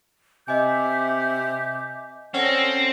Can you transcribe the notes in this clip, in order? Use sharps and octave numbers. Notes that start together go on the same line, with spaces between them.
C3 D#5 E5 G#5 D6 G6
C4 C#4 A4 D5 F#5 G5 A#6